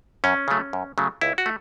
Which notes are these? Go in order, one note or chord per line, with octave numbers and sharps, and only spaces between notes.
F#2 C#4
C#3 F#3 A3
F#2
C#3 F#3 A3
C#2 E4
F#4
A3